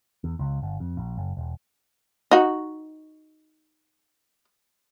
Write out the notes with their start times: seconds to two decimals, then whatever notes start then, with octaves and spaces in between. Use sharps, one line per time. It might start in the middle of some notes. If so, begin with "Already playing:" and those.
0.24 E2
0.39 C#2
0.62 G1
0.80 F2
0.97 A#1
1.17 F#1
1.37 E1
2.31 D#4 F#4